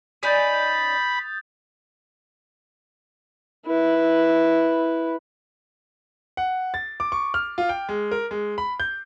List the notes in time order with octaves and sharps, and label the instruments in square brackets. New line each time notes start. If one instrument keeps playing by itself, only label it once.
[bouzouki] C#4 D#4 D5 [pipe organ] B5 [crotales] D#6 G6 A6
[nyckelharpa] E4 B4
[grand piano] F#5
A6
D6
C#6
F6
F4
G5
G#3
A#4
G#3
B5
G6